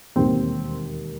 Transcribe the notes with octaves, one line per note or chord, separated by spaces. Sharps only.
E1 D#2 D#3 G3 C4